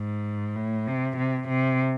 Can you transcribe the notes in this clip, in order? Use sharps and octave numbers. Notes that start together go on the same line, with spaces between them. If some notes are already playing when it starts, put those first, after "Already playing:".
Already playing: G#2
A2
C3
C3
C3